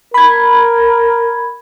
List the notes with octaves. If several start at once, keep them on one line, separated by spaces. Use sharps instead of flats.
A#4 B5 G#6